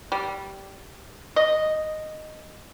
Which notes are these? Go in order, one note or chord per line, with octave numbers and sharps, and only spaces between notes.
G3
D#5